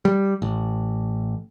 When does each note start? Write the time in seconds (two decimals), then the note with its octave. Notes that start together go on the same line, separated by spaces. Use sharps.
0.05 G3
0.42 A1